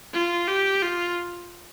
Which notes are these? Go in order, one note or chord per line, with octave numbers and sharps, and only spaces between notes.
F4
G4
F4